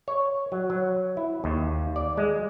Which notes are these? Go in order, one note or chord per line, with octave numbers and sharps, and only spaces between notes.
C#5
F#3
F#3
E4
D#2
D5
G#3